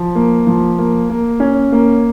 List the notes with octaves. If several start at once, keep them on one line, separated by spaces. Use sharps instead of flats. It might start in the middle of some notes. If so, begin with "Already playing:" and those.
Already playing: F3
A#3
F3
A#3
A#3
C#4
A#3